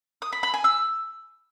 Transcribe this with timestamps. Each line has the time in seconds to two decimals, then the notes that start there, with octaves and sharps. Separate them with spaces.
0.22 D#6
0.33 B5
0.43 B5
0.54 G#5
0.64 E6